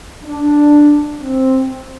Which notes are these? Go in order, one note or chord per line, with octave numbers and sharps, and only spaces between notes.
D4
C4